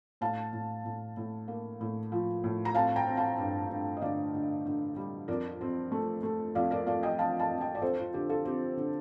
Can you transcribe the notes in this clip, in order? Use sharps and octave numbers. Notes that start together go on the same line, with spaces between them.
A2 F5 A5
A2
A2
A2
A#3
A2
F3
A2
A#5
C4 F5 A5
G5 A#5
C4
F5 A5
G2
G2
D#5
D3 D5 F5
D3
D3
G3
F2 A#4 D5
C4
A3
A3
F2 D5 F5
A#4 D5
A3 D5 F5
D#5 G5
C4 F5 A5
F5 A5
F2
D#5 G5
D5
F2 A4 C5
F4
D3 G4
F4 A4
C4 G4
D3